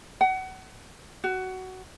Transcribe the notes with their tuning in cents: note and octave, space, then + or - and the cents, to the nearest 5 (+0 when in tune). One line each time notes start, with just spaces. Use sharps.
F#5 +30
F#4 +15